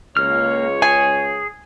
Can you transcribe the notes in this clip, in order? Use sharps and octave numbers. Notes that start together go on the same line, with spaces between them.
C#2 A#3 C#5 F6
G#4 G#5